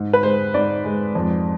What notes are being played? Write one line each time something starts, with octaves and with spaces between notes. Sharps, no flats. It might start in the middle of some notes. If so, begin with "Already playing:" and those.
Already playing: G#2
B4
G#3 C5
G#2 D5
G#3
F2